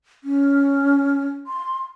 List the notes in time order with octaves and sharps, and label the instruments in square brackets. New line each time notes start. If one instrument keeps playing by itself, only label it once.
[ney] C#4
C6